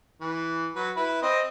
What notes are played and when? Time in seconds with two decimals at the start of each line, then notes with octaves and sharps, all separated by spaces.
0.21 E3
0.75 F#3 B4
0.96 E4 B4
1.22 C4 D#5